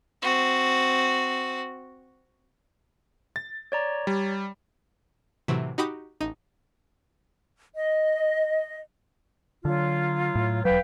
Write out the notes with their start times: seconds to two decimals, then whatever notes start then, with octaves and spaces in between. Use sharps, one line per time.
0.22 C4 F#4
3.36 A6
3.72 C#5 D5 A#5
4.07 G3
5.48 A2 C3 E3 F#3
5.78 D#4 F#4 G4 B5 D6 D#6
6.20 A1 D#4 D#7
7.74 D#5
9.65 D3 F#3 F4
10.36 A2
10.65 E1 F#3 B4 F5 G5